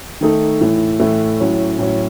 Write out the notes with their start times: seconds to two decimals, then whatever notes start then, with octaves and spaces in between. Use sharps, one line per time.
0.21 D#3 A3 D#4 A4
0.61 A2 E3 A3
1.00 A2 E3 A3
1.40 A2 F#3 C#4
1.79 A2 F#3 C#4